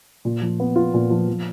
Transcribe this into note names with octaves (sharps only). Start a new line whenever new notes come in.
A#2
F3
B3
F4
A#2
F3
F3